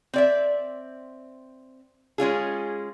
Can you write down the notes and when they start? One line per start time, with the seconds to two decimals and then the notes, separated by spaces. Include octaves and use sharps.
0.14 C4 D5 E5
2.18 G#3 C#4 F4 G#4